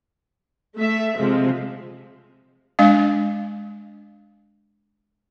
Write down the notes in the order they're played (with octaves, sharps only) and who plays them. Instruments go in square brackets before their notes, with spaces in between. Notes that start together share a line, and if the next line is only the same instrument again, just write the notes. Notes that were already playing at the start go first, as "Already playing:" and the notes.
[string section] A3 E5
C3 F3 G#3
[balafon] G#3 D4 F5